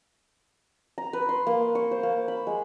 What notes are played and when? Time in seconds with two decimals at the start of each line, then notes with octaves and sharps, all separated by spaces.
0.98 A#5
1.13 B4
1.29 C6
1.47 A#3
1.75 C#6
1.91 C5
2.03 A#3
2.28 B5
2.47 G#3